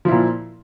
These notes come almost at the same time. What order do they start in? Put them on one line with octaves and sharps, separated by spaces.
F3 E4 A#2